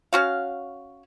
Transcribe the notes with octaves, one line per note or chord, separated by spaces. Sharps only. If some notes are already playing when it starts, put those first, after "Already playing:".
C#4 F#4 F5